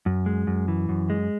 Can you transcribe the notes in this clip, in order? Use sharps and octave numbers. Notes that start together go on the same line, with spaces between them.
F#2
G#3
F#2
E3
F#2
G#3